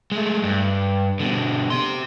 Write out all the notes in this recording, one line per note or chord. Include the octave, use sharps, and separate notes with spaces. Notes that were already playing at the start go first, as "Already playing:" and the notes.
G#3 A3
G2
B2 D3
G4 C6